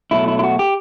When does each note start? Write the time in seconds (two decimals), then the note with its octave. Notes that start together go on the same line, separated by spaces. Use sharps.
0.11 B2 F#3 A3 E4
0.28 E4
0.39 E4
0.43 F#4
0.59 G4